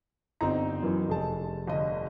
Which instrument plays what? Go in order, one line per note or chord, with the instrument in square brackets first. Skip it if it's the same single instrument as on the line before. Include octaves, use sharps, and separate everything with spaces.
[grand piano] G1 A#5 [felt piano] C4 D#4
[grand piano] F#2 E3
F1 G#4 A5
[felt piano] G1 D#5